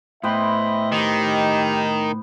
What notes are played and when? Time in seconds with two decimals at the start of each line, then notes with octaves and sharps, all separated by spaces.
0.23 A2 B3 B4 C5 D#5 E5 G5
0.92 D#3 D#4 G4